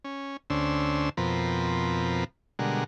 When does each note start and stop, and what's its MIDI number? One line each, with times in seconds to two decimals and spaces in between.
0.04 0.37 61
0.50 1.09 38
0.50 1.09 61
0.50 1.09 62
0.50 1.09 72
0.50 1.09 88
1.17 2.24 41
1.17 2.24 47
1.17 2.24 53
1.17 2.24 60
1.17 2.24 70
1.17 2.24 83
2.59 2.84 47
2.59 2.84 50
2.59 2.84 55
2.59 2.84 56
2.59 2.84 70
2.59 2.84 78